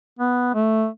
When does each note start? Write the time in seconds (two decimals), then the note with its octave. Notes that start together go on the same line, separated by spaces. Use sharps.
0.19 B3
0.54 A3